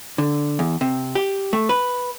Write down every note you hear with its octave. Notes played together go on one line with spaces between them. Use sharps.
D3
E2
C3
G4
A3
B4